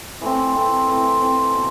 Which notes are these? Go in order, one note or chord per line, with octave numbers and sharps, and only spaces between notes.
E3 A3 C4
E3 A3 C4
E3 A3 C4
E3 A3 C4
B2